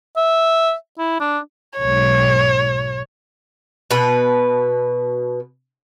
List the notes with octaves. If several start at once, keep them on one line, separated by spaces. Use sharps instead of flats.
E5
E4
D4
B1 G#2 C#5
B2 B4